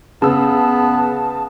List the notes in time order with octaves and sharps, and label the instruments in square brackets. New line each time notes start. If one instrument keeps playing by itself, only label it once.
[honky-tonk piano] C#3 E6 [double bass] B3 [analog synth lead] A5